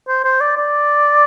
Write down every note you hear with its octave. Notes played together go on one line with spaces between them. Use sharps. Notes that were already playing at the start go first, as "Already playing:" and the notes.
C5
C5
D5
D5